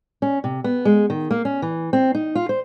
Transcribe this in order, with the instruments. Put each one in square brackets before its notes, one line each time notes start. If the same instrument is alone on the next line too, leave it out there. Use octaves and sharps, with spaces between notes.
[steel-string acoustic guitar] C#4
C3
B3
G#3
D#3
A#3
C#4
E3
C4
D#4
F4
C5